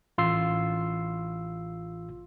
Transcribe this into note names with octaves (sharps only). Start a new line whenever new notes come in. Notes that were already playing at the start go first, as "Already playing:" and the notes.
A1 F4 C6 E6 C7